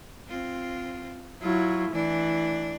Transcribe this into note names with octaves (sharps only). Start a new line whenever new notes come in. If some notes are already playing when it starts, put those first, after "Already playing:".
C4 F4
F#3 E4 F4
E3 A3 D4